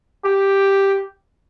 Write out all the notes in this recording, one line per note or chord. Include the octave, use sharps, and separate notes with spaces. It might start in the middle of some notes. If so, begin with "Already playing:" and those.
G4